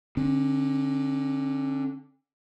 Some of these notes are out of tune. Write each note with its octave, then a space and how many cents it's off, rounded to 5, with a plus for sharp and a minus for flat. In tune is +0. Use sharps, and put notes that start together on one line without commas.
D3 +0 C#4 -45